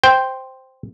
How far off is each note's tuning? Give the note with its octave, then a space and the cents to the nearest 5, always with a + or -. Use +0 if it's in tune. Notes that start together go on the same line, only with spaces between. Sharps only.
C5 +0 G5 +0